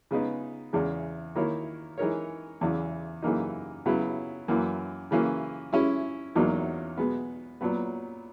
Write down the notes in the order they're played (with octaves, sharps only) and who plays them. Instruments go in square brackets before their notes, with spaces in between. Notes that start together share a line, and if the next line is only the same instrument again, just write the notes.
[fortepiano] C#3 G#3 B3 D#4
E2 C#3 G#3
D#3 A#3 E4 A#4 C#5
E3 G#3 D#4 A#4 C#5
E2 C#3 E3
F#2 C#3 E3 A#3 D#4
C#3 F#3 B3 E4
F#2 E3 A#3
C#3 E3 A#3 C#4
G#3 C#4 E4
E2 B2 F#3 A#3 D#4
B2 G#3 B3
A#2 F#3 B3